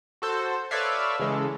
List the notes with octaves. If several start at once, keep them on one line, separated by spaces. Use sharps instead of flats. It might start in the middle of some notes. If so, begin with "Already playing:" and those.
F#4 A4 C5
A4 B4 C#5 D5 E5 F5
C#3 E3 G#3 A4